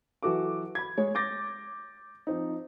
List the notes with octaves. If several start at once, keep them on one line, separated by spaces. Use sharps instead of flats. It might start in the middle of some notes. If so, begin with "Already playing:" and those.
E3 F#3 F#4 A4 D6
B5 G#6
G#3 C#5
D6 G6 A6 A#6
F3 C4 D#4